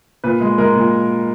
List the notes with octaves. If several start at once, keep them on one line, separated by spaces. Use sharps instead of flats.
A#2 B4
G#3
G#3 A#4
A#2